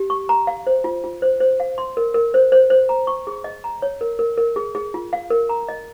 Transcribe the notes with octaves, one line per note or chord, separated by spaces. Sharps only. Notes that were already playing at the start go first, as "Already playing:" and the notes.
Already playing: G4
C#6
A#5
F5
C5
F4
F4
C5
C5
F5
C6
A#4
A#4
C5
C5
C5
A#5
C#6
G#4
D#5
A#5
C#5
A#4
A#4
A#4
G#4
G#4
F4
F5
A#4
A#5
D#5